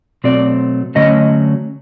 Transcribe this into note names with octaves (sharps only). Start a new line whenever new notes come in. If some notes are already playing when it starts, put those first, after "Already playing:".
B2 F#3 A3 C4 D5
D3 F#3 A3 C#4 D#5